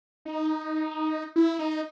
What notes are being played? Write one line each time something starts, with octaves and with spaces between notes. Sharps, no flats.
D#4
E4
D#4